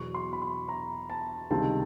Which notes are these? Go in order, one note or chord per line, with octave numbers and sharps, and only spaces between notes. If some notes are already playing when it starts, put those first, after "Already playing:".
Already playing: E2 B2 F#3 C#6
C6
B5
C6
A#5
A5
C#2 C3 D#3 G3 C4 A5